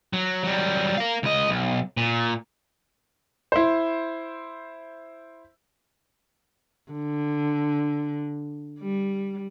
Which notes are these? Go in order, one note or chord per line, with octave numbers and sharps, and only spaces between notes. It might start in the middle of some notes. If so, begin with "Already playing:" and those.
F#3
F#3 G3
A#4 F5
C#2 D#5
B1
A#2
E4 C5
D3
G3